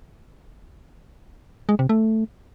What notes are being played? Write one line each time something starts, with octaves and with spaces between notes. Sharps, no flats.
G#3
C3
A3